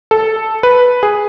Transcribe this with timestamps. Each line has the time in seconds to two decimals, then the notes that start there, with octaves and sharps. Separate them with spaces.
0.11 A4
0.63 B4
1.03 G#4